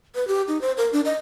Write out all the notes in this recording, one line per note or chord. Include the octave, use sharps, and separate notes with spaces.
B4
G4
D#4
C5
A#4
D4
D#5